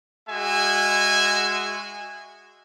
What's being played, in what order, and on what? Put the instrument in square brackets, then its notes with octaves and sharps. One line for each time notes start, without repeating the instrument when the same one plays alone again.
[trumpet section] G#3 F#4 E5 G#5